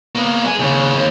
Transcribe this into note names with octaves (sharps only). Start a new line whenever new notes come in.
A#3 B3
G#3 G#5
D#2 C#3
D#2